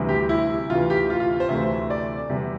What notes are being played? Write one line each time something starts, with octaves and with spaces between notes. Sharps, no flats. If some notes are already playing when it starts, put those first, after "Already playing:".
Already playing: D2 C3 E3 G3
G4
E4
D2 C3 E3 F4
G4
F4
F4
C5
D2 C3 E3 A3 E5
D5
E2 C3 G3